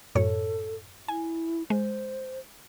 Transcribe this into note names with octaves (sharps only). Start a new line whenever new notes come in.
F#2 A2 A4 C#5
E4 G#5
G#3 C5